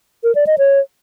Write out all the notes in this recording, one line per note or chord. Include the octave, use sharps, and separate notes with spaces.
A#4
D5
D#5
C#5